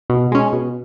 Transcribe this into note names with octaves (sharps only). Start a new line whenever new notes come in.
B2
G#3 C#4
B2